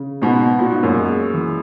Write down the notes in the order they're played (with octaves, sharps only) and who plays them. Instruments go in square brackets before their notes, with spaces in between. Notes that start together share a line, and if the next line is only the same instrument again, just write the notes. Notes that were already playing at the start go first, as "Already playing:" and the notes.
Already playing: [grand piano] C#3
[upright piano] G#2 B2 [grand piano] B3
[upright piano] A#2 [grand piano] F#4
[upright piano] G#2
F#2 A#2
[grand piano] G#3
E3